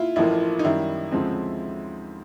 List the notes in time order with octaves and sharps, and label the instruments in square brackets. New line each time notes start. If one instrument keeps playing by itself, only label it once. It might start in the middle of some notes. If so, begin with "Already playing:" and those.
Already playing: [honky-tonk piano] E4 F4
[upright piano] A1 A2 F3 A#3 [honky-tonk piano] E4
[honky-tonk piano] D#4
[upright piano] F#2 D#3 G3 [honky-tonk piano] E4
[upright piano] D2 C#3 F3 G#3 C4